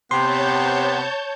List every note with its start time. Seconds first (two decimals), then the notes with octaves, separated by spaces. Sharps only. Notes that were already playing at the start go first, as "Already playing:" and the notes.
0.11 C3 B3 C#5 A5 C6 G6